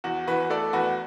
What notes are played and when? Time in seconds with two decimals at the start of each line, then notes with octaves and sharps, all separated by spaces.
0.04 E2 F#4
0.27 E3 F#4 B4
0.50 A3 A4 D5
0.73 E2 F#4 B4